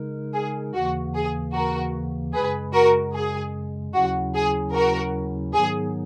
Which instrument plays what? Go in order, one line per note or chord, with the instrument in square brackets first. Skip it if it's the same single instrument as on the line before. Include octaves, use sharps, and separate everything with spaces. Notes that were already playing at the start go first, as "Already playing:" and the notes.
Already playing: [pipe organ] C#3 G#3 D#4 A#4
[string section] G#4
[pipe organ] D#2 C#3 E3 A#3 [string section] F#4
[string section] G#4
F#4 A#4
[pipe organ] F#2 C#3 G#3 [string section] G#4 B4
[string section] F#4 A#4
G#4
[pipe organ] D#2 C#3 F#3 C#4 E4 [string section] F#4
[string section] G#4
F#4 A#4
[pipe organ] G#2 D#3 F#3 B3 D#4 [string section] G#4